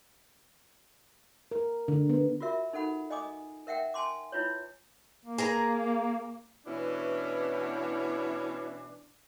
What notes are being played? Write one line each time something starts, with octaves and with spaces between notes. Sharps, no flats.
A#4
D3
B3
F4 F#4 A#4 E5
D#4 A4 F#5 B5
D#5 G#5 D6 D#6
A#4 E5 F#5 G5
G#5 A5 C6 D6
E4 F4 B4 C#5
A#3
G#4 A#4 A#5
B2 E3 C#4 D4 E4